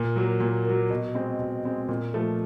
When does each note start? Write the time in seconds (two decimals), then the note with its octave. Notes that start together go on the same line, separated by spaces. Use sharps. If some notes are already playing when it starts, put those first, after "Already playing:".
Already playing: A#2
0.16 F#3 A#3
0.40 A#2
0.65 F#3 A#3
0.90 B2
1.15 G#3 C4
1.39 B2
1.65 G#3 C4
1.89 A#2
2.14 F3 A3